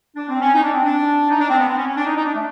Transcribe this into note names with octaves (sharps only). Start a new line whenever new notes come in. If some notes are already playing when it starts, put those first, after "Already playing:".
D4
C4
C#4
D#4
D4
C4
D4
D#4
D4
C4
B3
C4
C#4
C#4
D4
D#4
D#4
D4
A3